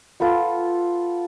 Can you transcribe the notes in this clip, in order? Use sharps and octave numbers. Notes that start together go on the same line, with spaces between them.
F4 A4 B4 F#5